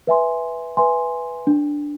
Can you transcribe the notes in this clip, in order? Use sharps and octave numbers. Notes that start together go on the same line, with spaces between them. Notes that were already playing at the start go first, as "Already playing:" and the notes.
B4 E5 G#5 C6
B4 E5 G#5 C6
D4